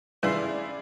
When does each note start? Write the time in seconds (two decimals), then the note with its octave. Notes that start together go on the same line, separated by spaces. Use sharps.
0.23 G2 C#4 E4 G#4 D5 E5 F5 C6